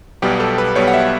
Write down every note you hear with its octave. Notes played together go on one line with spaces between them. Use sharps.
B1 B2 G3 B3 G4
A4
B4
B1 B2 G3 B3 C#5
F#5
E5